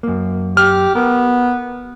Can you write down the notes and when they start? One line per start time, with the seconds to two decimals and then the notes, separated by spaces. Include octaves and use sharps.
0.03 F#2 A#3
0.57 G4 F6
0.95 B3 A#4